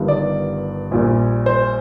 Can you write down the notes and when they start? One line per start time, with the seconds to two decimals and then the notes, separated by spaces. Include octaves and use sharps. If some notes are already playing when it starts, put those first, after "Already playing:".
Already playing: G1 G2 D#3
0.08 D5
0.91 A#1 A#2 G3
1.46 C5